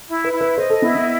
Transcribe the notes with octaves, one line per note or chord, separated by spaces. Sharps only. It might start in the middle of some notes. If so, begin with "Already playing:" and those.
E4
B4
E4
B4
C5 D#5
A4
B3 E4
B3